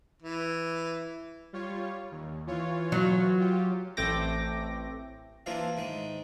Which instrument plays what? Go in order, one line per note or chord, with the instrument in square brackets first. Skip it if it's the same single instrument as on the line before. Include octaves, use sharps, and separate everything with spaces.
[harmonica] E3
[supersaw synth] G3 F4 C#5
D#2
E3 F4 C#5
[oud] F#3
[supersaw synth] F4 G4
[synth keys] A1 A3 C4 G5 D6 A#6
[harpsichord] E3 F3 A#3 D4 E4 F4
G#2 D#3 G#3